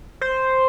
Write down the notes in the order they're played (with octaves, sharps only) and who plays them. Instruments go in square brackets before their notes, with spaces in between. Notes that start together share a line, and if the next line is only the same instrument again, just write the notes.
[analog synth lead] C5